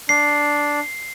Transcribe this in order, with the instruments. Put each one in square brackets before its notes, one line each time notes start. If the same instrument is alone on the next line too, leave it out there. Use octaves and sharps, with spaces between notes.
[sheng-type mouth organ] D4 [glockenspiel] C7